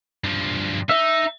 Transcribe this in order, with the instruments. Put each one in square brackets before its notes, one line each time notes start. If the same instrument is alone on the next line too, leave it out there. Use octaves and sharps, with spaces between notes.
[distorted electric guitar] G2 F3
[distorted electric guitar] D#4 [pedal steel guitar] E5